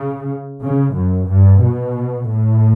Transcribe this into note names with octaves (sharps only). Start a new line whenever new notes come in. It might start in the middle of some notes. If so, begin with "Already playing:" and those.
Already playing: C#3
C#3
F#2
G2
B2
A2